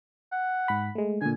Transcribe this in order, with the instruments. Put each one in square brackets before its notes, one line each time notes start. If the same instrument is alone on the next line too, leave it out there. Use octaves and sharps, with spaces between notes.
[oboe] F#5
[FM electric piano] G#2 B5
G#3 A3
[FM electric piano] A#2 D3 [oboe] G#5